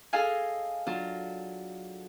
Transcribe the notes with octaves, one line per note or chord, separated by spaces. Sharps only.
G#4 A4 D#5 F5 G#5
F#3 D4 F4